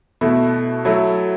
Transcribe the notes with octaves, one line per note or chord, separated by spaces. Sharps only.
B2 A3 E4
F#3 A3 E4